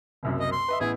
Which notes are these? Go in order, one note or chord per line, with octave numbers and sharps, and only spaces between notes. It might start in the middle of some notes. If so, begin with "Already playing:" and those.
F#1 C2 F#2
D#5
C6
B4 D#5 E5
A1 B3 E4 G#4